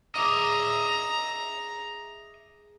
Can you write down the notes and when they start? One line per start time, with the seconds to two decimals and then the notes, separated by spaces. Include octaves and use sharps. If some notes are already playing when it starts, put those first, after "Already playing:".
0.15 G#4 D#5 E5 A#5 D6